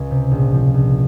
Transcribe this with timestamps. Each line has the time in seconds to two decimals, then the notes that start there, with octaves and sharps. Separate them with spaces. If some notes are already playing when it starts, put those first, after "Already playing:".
Already playing: C#2
0.11 C3
0.31 A#1
0.54 F3
0.74 A#1